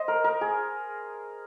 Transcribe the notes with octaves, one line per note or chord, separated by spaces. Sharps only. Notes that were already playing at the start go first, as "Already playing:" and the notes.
Already playing: C5 D#5
A#4
A#4
G#4